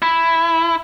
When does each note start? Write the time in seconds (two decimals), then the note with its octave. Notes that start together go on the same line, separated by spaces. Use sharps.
0.02 E4